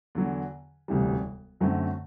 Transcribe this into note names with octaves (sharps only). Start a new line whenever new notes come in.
E2 D3 F#3
E1 D2 C3 E3 G3
F#2 D3 F#3 A3 C4